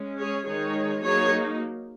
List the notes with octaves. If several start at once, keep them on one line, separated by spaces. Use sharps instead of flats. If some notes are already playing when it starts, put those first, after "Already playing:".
Already playing: G#3 C#4
G#4 C#5
D#3 G#3 D#4 G#4 C#5
F#3 A#3 D#4 G#4 C#5